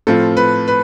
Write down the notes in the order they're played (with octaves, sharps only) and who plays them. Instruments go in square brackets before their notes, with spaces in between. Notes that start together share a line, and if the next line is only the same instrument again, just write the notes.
[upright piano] A2 F3 C4 F4 A4
B4
B4